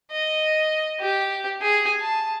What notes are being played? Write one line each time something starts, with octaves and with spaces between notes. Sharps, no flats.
D#5
G4
G#4
A5